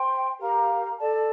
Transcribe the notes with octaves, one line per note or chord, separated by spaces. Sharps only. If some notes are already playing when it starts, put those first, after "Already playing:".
Already playing: C5 G5 C6
G4 A#4 F5 A#5
A4 D5 A5